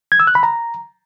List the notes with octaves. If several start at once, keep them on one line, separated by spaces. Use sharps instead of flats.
G#6
E6
F#6
B5
A#5